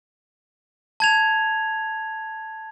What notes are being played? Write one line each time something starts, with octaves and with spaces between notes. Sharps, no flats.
A5 G#6 F7